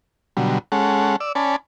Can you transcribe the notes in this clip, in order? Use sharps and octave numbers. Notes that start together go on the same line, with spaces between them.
B2 D3 F#3 G3
G#3 C#4 A4 F#5
D5 E6
C#4 D5 G#5 A5 B5